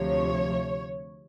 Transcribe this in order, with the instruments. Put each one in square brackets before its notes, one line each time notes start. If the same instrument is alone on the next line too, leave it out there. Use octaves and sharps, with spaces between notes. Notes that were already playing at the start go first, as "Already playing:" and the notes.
Already playing: [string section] D2 C3 F3 C#5